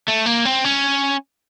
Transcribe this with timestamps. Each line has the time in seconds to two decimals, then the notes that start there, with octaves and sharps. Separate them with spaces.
0.08 A3
0.26 A#3
0.45 C4
0.65 C#4